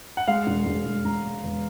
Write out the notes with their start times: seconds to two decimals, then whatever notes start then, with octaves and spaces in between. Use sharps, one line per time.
0.17 F#5
0.28 G#3 F5
0.47 E1
0.66 E1
0.86 E1
1.05 E1 A#5
1.24 G#3
1.43 E2